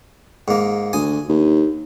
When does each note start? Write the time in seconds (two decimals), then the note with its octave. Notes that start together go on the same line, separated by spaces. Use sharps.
0.48 G#2 A#3
0.93 D2 G#5 D#6
1.29 D#2